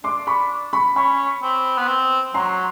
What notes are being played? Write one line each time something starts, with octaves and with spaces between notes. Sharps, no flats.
D4 C6 D6
B5 C#6
B5 C#6
C#4 B5 C#6
C4
B3
C4
F#3 A#5 C6